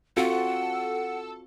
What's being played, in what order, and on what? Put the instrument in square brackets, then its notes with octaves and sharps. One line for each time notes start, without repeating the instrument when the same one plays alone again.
[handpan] C4 F4 F#4 [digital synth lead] A4 [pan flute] F#5